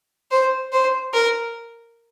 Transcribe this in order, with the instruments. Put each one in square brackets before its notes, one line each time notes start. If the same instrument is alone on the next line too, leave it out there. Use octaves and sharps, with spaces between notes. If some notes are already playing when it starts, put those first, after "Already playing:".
[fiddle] C5
C5
A#4